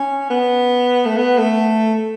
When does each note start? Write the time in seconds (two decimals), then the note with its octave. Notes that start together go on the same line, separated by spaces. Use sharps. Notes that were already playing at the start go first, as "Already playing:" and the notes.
Already playing: C#4
0.30 B3
1.05 A3
1.17 B3
1.38 A3